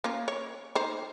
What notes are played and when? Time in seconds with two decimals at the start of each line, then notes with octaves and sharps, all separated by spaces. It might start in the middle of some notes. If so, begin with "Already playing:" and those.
0.04 A#3 C#4 F4
0.28 C#5
0.75 D#4 C5